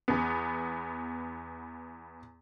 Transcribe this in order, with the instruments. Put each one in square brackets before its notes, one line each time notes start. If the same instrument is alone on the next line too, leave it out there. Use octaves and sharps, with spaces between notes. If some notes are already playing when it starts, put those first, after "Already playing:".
[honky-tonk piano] E2 B3